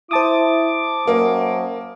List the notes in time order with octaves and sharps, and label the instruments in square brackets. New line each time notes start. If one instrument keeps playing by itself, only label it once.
[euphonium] E4 [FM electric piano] C5 A5 D#6 [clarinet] D6
[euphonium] F#2 [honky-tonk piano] A#3